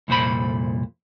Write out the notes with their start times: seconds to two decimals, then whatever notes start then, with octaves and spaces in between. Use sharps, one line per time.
0.08 C2 F2 A#2 C5 B5